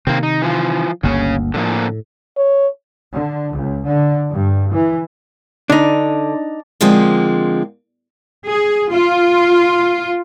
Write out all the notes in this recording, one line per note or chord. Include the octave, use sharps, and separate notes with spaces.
C3 D#3 A#3 C4
D#4
E3 F3 F4
G1 D2 C#3 A#3 C#4
A2 D3 F3 A#3
C#5
D3
C#2
D3
G2
E3
D3 D4 D#4
D3 F3 G#3 A#3 C4
G#4
F4